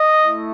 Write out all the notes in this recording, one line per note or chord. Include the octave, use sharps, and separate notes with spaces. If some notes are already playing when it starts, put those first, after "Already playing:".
Already playing: D#5
A3 E4